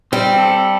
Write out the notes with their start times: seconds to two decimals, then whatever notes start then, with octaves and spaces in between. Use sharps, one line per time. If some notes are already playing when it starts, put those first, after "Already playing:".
0.12 G3 C4
0.38 A4